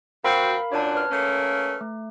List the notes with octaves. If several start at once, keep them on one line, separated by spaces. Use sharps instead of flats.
G2 C4 F#4 A#4 F5 B5
F#2 A#2 D4 C#5 A5
B4 F6
A3 A#3 C#4
A3